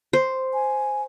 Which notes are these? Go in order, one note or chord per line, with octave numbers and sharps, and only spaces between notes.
C5
G#5